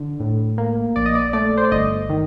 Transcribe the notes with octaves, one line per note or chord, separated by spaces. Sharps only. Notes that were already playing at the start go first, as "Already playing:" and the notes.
Already playing: D3
A2
A#3
A#1 D5
D#5
D5
A3 D5
C5
D5
G1 D#5
D#3